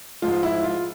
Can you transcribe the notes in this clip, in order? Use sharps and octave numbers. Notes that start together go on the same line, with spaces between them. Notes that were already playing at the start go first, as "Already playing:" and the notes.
G#2 F3 G#3 F4
E4
F4